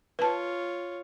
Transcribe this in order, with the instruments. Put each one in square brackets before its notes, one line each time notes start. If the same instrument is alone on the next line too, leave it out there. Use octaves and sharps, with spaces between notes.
[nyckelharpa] F4 C#5 [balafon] B4 A5